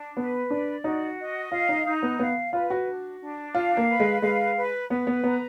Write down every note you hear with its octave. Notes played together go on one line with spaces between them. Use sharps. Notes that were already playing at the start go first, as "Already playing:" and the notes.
Already playing: D4
B3 B4
D4 D5
D#4 F#4
D#5
F4 F5
D#4
D#4
B3
B3 F5
F4 B4
F#4
D4
D4
F4 F5
A#3
B4
G#3
G#3 F5
B4
B3 B4
B3
B3 A#5